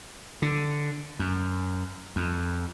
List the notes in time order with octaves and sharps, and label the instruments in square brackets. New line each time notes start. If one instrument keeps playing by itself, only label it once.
[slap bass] D3
F#2
F2